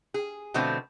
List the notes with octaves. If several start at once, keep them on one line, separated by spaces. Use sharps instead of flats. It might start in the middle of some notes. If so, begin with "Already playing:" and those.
G#4
B2 D3 F3 A3 B3 C4